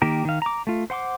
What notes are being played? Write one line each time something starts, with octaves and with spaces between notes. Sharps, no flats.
D#3 A#3 G4 A#4
D#3 F5
A#5 D6
A3 F4
C5 F#5 C6 D6